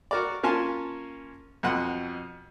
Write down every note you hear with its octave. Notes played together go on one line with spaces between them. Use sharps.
F#4 A#4 D5
A#3 C#4 F4 G#5 A5 C6
F2 B2 F#5 C6